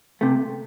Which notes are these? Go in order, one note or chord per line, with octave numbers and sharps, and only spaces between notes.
C3 A3